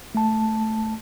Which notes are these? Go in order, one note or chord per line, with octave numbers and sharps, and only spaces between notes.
A3 A5